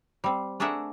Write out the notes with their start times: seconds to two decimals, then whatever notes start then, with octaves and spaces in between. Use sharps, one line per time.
0.24 G3 C4
0.60 A3 D4 G#4 A#4 E5 F#5